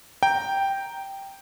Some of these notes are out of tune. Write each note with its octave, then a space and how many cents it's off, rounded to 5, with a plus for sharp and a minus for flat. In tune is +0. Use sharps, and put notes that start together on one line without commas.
G5 +0 A#5 +0